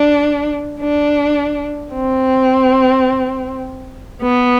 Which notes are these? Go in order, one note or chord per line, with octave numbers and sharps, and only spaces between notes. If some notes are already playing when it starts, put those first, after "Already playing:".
Already playing: D4
D4
C4
B3